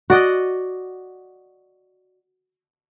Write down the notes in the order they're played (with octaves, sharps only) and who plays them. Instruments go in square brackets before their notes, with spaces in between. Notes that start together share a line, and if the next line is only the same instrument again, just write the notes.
[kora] F#4 D5 D#5 F#5